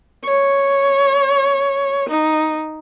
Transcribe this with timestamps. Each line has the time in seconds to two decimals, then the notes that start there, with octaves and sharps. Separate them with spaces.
0.25 C#5
2.10 D#4